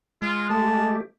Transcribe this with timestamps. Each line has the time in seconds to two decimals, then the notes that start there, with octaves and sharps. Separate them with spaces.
0.22 G#3 F4
0.50 A3 G4 A5